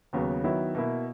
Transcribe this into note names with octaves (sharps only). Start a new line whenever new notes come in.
D#2 C#3 F#3 B3
D#3 F#3 B3 E4
B2 A#3 E4